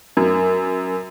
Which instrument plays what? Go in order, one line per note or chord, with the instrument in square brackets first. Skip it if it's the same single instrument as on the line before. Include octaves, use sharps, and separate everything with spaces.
[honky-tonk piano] F#2 [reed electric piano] A#4